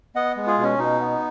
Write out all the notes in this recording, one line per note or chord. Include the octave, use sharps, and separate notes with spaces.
B3 D#5 F#5
G#3
F4 G#4
B2
C#4
B2 D#4
B3